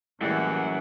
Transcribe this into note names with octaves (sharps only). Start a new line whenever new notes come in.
F#2 A2 E3 G3 G#3 A#3 F#5